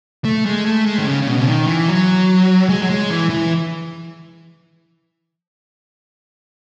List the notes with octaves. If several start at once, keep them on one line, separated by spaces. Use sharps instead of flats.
A3
G#3
A3
G#3
D#3
C#3
C#3
B2
C#3
D#3
E3
F#3
G#3
F#3
G#3
E3
E3